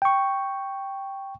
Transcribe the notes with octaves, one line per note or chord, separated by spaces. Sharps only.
G5 C#6